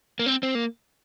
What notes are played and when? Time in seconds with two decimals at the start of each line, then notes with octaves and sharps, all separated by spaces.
0.19 A#3
0.26 C4
0.43 C4
0.55 A#3